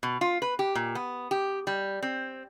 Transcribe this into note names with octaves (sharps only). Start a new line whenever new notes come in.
B2
F4
B4
G4
A#2
B3
G4
G3
C4